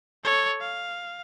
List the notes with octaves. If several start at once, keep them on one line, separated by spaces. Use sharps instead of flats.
A4 C#5
F5